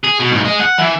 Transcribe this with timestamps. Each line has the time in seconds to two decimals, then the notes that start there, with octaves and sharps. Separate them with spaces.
0.04 G#4
0.19 B2
0.32 G#2 B2
0.45 G#4 D#5
0.61 F#5
0.79 E3